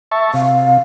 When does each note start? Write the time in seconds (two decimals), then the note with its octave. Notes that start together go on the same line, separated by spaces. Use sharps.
0.11 E5 A5 C#6
0.34 C3 F5